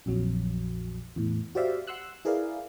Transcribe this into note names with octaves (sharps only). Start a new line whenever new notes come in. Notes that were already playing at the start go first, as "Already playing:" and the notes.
A#1 F2 F#3
E2 A2
F#4 G4 C5 D5 E5 F5
F#5 C6 E6 F#6
E4 G#4 A#4 B4 D5 F5